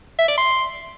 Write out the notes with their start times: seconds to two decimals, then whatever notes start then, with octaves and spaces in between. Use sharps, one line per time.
0.19 E5
0.28 D5
0.38 C6